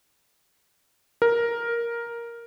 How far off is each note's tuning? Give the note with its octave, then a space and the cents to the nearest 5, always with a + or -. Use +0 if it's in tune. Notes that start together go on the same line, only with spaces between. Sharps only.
A#4 +5